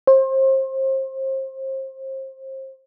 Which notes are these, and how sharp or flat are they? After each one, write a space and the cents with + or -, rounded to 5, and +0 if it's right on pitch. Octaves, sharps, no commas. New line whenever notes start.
C5 +30